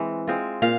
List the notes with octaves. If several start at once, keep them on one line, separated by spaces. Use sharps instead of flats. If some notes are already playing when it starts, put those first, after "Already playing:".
Already playing: E3 G#3 C4
G#3 C4 F4
A#2 F5